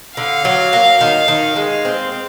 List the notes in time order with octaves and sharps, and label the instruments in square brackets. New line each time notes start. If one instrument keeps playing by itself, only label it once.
[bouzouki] D3 [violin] F5
[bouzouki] F#3
A#3
D#3
D#3
G#3
C4
C4